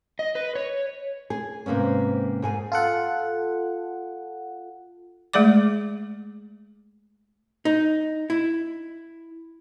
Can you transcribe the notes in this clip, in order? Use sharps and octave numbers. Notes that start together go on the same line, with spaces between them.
D#5
B4
C#5
G#4
G#2 C3 A#3 B3 C#4
G#2 G#4 G#5
F4 A4 F#5
G#3 A3 G#4 D5 D6
D#4
E4